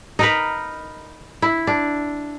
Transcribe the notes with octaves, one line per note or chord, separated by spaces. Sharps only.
D#4 A#4 B4
E4
D4